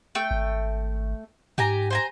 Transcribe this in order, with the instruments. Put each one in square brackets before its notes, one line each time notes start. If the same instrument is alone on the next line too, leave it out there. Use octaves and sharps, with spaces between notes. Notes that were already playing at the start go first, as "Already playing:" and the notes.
[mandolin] A3 G5
[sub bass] G#1
[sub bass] G#2 [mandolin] G4 G#5 A#5
[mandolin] C5 G#5 A#5